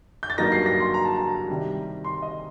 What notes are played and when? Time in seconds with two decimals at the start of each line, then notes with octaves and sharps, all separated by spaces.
0.23 G6
0.30 A6
0.38 G2 F#3 A#3 D#4 A#6
0.52 C7
0.66 A#6
0.80 C6
0.94 A#5
1.05 A5
1.16 A#5
1.48 C3 D#3 G3
2.04 C6
2.22 D#5